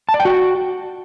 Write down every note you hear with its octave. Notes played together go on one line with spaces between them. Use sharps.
A5
D5
G5
F#4